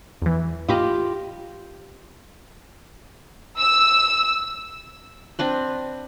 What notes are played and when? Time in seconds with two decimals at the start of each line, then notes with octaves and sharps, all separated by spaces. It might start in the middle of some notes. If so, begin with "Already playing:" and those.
0.22 E2 E3
0.69 F4 G4 D#5 B5 D6
3.59 E6
5.39 C4 D4 B4